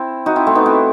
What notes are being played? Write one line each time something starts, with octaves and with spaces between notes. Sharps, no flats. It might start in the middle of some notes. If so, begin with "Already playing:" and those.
Already playing: C4 E4
D#4 F#4
C4 E4
A3 C4
B3 D#4
C4 E4